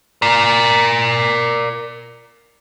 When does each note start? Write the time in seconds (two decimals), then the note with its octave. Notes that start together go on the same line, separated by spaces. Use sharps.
0.22 A#4 D5